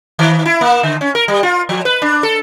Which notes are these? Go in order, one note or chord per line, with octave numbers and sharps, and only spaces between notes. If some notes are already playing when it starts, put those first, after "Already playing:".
D#3
E4
A#3
D3
C#4
A#4
G3
F4
F3
B4
D4
A4